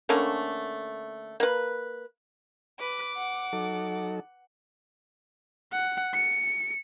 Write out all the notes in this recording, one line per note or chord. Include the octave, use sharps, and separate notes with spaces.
D3 A3 A#3 C#4
A#3 B4
B4 D6
F#5
F#3 D#4 A4
F#5
C#7